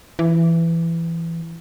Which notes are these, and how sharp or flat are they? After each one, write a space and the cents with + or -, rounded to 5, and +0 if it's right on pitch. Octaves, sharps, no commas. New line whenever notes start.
E3 +15